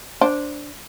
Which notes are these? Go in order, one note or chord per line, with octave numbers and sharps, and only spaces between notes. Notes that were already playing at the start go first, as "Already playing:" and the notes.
D4 C5